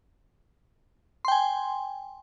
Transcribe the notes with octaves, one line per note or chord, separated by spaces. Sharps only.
G5 G#5 C6